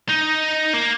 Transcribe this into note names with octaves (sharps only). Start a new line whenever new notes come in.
D#4
A#3